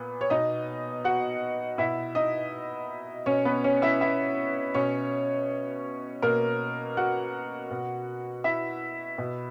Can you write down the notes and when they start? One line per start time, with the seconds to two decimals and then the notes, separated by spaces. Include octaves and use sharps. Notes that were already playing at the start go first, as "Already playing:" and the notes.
Already playing: A#2 B3
0.21 C#5
0.30 B2 D#4 D#5
1.04 F#4 F#5
1.78 B2 E4 E5
2.15 D#4 D#5
3.26 B2 C#4 C#5
3.45 B3 B4
3.64 C#4 C#5
3.82 E4 E5
4.01 E4 E5
4.74 B2 C#4 C#5
6.22 B2 A#3 A#4
6.97 F#4 F#5
7.71 B2
8.44 E4 E5
9.18 B2